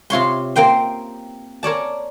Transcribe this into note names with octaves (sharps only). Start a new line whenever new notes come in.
C3 F4 C#5 C6
A#3 C4 G5 C6
A#4 C#5 D5 A5